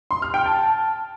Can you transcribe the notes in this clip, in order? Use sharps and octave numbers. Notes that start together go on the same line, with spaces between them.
C6
F6
G5
A5